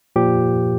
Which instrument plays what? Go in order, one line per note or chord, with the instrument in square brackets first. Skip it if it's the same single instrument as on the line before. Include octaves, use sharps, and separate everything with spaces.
[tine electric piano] A#2 F3 G4